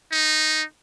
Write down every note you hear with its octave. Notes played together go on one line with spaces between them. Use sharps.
D#4